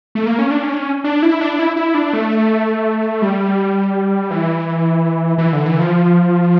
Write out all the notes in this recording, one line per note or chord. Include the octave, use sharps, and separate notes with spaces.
A3
A#3
C#4
D4
C#4
D4
C#4
D4
E4
D4
E4
E4
D4
A3
G3
E3
E3
D3
E3
F3